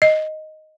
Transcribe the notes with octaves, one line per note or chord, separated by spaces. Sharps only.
D#5